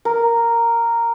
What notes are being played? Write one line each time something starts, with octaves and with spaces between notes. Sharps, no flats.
A#4